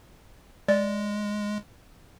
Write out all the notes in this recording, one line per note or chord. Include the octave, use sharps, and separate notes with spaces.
G#3 D5